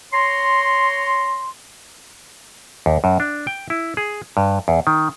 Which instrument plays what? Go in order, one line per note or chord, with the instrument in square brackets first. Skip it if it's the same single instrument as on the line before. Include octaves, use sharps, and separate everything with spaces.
[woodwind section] C#5 A#5 C6
[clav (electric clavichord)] D#2
F#2
D4
G5
E4
G#4
G2
E2
D#3